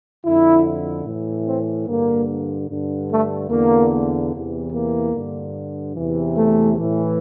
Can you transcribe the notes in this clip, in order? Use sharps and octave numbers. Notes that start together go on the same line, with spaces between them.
F2 D3 E4
A2 E3
C4
G2 D3 A#3
G2 D3
A3
E2 D3 A#3
E2 C3 E3
A#3
G2 D3
E2 C3 E3
A3
A2 E3